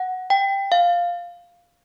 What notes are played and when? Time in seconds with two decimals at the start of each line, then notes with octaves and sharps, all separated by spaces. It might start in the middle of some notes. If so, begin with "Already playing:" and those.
Already playing: F#5
0.30 G5
0.72 F5